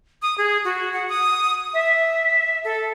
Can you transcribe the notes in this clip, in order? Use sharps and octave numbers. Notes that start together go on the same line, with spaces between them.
D#6
G#4
F#4
F#5
D#6
E5
A4